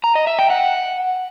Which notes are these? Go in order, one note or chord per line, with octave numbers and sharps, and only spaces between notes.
A#5
D#5
E5
G5
F#5